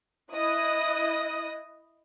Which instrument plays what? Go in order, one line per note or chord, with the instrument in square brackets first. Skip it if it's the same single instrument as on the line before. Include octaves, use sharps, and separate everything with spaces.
[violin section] E4 D#5 D#6 F#6